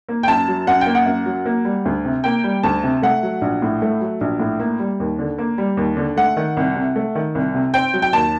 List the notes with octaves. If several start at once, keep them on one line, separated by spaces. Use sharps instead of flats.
A#3
G5
F#2 A5
F#3
F#2 F#5
G5
A#3
F#5
F#2
F#3
A#3
G3
D2
C3
A#3 G5
G3
D2 A5
C3
A3 F#5
F#3
A#1
A2
A3
F#3
A#1
A2
A#3
G3
D#2
D3
A#3
G3
D#2
D3
A3 F#5
D#3
C2
C3
A3
D#3
C2
C3
C4 G5
F#3
G5
D#2 A5